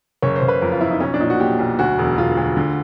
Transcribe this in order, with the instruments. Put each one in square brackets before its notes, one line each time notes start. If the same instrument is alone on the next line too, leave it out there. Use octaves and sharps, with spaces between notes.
[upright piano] F#1 C#5
C5
F#1
B4
F2 A#4
F4
F2 E4
D#4
B1 C#4
D4
A#2 D#4
F#4
A#2 G4
B1
D2 F#4
E1
E1 F4
D2
D3